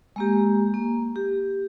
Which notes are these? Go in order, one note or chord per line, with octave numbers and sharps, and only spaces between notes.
G#3 A#3 G4
A#3
G4